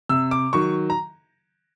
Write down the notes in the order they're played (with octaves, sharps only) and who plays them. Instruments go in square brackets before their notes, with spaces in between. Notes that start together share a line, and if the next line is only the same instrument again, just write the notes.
[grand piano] C3 E6
D6
D#3 F#3 C#6
A#5